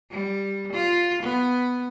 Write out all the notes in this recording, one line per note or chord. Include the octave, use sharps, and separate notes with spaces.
G3
F4
B3